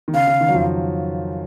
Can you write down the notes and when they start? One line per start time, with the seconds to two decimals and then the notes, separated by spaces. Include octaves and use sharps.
0.08 D#3
0.14 C#3 F5
0.27 C#3
0.41 D#3
0.49 F#3
0.54 F2 F3